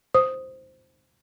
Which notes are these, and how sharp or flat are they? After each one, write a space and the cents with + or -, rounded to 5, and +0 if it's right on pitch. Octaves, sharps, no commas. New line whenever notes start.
C5 +0 D#6 +0